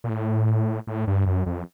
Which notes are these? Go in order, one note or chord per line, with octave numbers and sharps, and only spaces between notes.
A#2
A2
A2
G2
F#2
F2